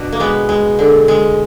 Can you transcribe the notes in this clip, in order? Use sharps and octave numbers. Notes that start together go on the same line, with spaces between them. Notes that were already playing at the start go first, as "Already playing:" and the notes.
Already playing: B2 D4
A#3
G#3 B3
G#3
D3
G#3